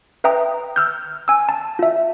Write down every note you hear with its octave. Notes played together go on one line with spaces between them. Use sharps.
B4 E5 G5 A#5 D#6
E6 F6 G6
G#5 E6
A5
F4 E5